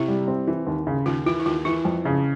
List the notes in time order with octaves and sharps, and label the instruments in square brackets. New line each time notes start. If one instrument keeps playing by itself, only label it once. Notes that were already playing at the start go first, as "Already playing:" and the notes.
Already playing: [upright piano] C3 [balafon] E4
[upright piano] G3
C4
E3
D#2
C#3
[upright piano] D#2 [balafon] F4
[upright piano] E3 [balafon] F4
[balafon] E4
[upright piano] D#2 [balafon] F4
[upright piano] E3 [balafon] E4
[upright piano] F2
C#3